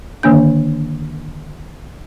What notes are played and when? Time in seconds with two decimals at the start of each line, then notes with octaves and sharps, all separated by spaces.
0.23 D3 D#3 A#3 D4 G6